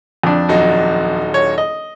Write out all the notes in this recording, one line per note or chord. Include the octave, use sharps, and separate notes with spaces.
F2 D4
D#1 F#3 D#4
C#5
D#5